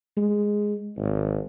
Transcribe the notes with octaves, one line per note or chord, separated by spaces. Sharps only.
G#3
G#1